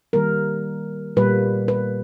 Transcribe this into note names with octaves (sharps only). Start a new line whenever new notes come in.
D#3 G3 A#3 A#4
A#2 G3 A#3 B4
B4